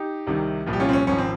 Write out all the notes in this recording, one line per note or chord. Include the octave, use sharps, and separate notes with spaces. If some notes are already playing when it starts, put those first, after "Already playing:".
Already playing: D#4 G4
C2 C3 D#3
C2 A#2 F3
G4
C#4 F4
C4
C#4
G#1 G#2 F3 C#4
C4